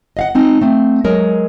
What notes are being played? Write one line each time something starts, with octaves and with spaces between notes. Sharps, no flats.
D#5 F5 F#5
G#3 C4 D#4
A3 C4
F#3 G#3 A#4